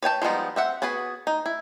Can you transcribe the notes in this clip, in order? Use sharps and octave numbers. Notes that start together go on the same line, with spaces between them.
B4 C#5 G5 A5
F3 G3 G#3 B3 D#4
C4 E5 F#5
B3 F#4 G#4 B4
D#4
E4